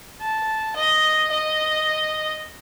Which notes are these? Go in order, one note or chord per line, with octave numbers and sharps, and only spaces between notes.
A5
D#5
D#5